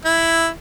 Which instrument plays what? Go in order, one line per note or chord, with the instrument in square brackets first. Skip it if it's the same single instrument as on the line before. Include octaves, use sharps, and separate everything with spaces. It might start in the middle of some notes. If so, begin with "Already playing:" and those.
[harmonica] E4